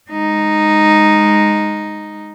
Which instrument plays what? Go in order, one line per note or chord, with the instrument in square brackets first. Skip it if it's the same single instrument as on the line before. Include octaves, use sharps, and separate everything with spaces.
[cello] G#3 D#4